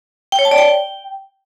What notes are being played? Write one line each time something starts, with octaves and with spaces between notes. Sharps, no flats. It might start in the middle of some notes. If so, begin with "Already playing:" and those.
G5
C#5
A5
D5
G5